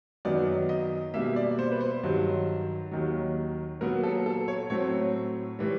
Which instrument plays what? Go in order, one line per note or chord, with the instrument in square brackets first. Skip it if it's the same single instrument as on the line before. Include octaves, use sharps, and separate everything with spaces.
[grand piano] F#2 D#3 F#3 B3 D5
D#5
B2 G3 A#3 E5
D5
C5
B4
C5
G2 D#3 F#3
D#2 D#3 F#3
A#2 F#3 B3 A#4
A4
A4
C#5
A2 F#3 A3 C4 C#5
A2 E3 G3